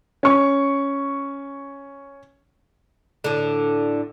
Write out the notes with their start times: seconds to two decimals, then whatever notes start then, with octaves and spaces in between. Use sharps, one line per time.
0.23 C#4 C#6
3.24 A2 D3